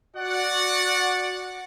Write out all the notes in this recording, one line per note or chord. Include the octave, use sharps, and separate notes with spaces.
F#4 D5 F#5